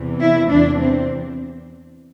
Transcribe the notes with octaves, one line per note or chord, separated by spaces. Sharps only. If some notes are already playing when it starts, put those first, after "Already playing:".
Already playing: E2 C3 E3
E4
E2 C3 E3 D4
C4